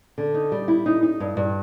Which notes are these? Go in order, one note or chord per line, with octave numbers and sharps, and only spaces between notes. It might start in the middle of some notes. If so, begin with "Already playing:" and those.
D3
D#4
G3
E4
D#4
D#4
G2
G2